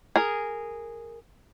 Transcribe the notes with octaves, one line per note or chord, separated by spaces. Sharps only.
G#4 A#4